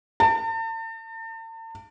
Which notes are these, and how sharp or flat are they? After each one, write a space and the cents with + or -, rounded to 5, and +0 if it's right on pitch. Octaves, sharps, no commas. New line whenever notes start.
A5 +40